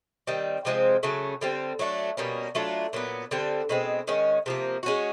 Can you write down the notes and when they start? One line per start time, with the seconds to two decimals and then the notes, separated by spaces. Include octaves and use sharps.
0.27 D#3 G3 C4
0.65 C3 F3 G#3 C4
1.03 C#3 F#3 A3 C#4
1.41 D3 G3 C4
1.79 F#3 A3 D4
2.17 B2 G3 A#3 C#4
2.55 F#3 A3 D4 F4
2.93 A#2 F#3 B3
3.31 D3 G3 C4
3.69 B2 G#3 C4
4.07 D#3 G#3 C#4
4.46 C3 F3 A#3
4.83 G#3 C#4 F#4